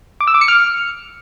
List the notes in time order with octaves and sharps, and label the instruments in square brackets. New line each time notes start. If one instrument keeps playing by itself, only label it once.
[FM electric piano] D6
E6
D6
C#7
F6